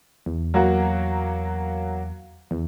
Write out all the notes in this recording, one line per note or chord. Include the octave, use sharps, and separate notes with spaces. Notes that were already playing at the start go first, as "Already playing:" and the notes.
E2
F#3 A#3 F#4
E2